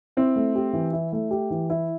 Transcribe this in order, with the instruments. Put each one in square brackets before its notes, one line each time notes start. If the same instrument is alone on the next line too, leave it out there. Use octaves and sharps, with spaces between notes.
[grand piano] C4 [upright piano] E4
[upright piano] A3
G4
E3
E4
A3
G4
E3
E4